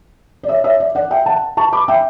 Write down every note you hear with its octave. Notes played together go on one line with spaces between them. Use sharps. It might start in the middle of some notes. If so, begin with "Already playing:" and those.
D5
C#5 E5
C#5 E5
D5
D5 F#5
E5 G5
F#5 A5
A5 C#6
B5 D6
E5 G5